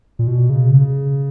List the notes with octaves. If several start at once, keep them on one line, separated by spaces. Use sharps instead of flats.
A#2
B2
C#3
C#3